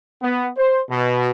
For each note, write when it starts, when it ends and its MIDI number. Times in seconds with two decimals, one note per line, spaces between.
0.22 0.49 59
0.57 0.80 72
0.90 1.30 47